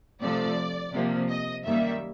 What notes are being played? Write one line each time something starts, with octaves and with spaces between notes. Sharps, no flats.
C3 F3 A3 D5
C3 F3 A#3
D#5
F#2 D#3 G3 A#3 E5